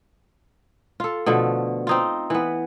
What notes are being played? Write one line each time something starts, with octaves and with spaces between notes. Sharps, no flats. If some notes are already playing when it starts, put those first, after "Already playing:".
F4 A4
B2 D3 F3 A3
C4 D#4 F4
E3 B3